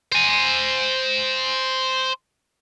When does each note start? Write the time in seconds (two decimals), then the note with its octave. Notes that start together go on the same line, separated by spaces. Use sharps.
0.12 C5 G#5